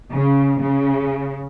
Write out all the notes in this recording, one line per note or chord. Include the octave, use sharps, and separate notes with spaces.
C#3
C#3